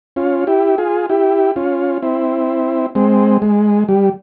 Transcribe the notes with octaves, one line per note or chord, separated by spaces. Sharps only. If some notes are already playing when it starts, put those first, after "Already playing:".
C#4 F4
E4 G4
F4 G#4
E4 G4
C#4 F4
C4 E4
G#3 C4
G#3
G3